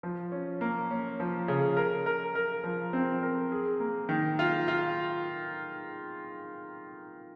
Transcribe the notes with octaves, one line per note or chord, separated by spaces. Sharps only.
F3
C#4
A#3
C#4
F3
C#3
A#4
A#4
A#4
F3
C4
A#4
G#4
A#3
D#3
F4
F4